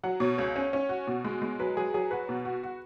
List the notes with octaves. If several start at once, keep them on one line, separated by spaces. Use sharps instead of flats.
F#3 F#5
B2 C#5
C#2 C#5
C#4
C#4
F#4
B2
G#3
G#3
F#3 B4
F#3 G#4
F#3 G#4
F#4 B4
B2
F#4
F#4